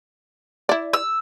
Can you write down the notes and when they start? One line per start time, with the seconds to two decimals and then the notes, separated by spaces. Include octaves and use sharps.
0.69 E4 D5
0.93 E6